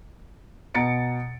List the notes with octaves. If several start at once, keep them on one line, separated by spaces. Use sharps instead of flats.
B2 A#5 A6 C#7 D7